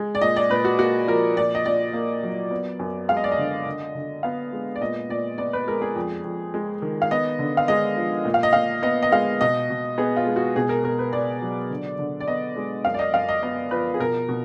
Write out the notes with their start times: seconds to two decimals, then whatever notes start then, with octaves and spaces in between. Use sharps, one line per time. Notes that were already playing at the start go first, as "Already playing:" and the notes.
Already playing: G#3
0.15 D5
0.21 A#2 D#5
0.36 D5
0.50 A#2 B4
0.65 F#4
0.79 A#3 F#4
1.07 F3 A#4
1.36 A#2 D5
1.55 D#5
1.65 A#2 D5
1.93 A#3
2.23 F#3
2.51 B3
2.79 F#2
3.09 G#3 F5
3.17 D#5
3.24 D5
3.32 D#5
3.38 D3
3.66 D3
3.95 D3
4.23 B3 F5
4.52 G#3
4.76 D5
4.81 A#2 D#5
5.09 A#2 D5
5.38 B3 D5
5.53 B4
5.67 G#3 A#4
5.82 G#4
5.96 F2
6.24 F2
6.54 G#3
6.82 D#3
7.02 F5
7.11 B3 D#5
7.39 D3
7.57 F5
7.68 G#3 D#5
7.97 F3
8.25 A#2
8.34 F5
8.43 D#5
8.53 A#2 F5
8.83 B3 D#5
9.03 D#5
9.11 G#3 F5
9.41 B2 D#5
9.70 B2
9.98 B3 G#4
10.17 F4
10.26 G#3
10.36 F#4
10.56 B2 G#4
10.69 A#4
10.84 B2 A#4
10.99 B4
11.13 B3 D5
11.42 F#3
11.71 D3
11.99 D3
12.20 D5
12.28 B3 D#5
12.56 G#3
12.85 F#2 F5
12.94 D5
12.99 D#5
13.14 F#2 F5
13.29 D#5
13.43 B3 D#5
13.71 F3 B4
13.94 G#4
13.99 B2 A#4
14.29 B2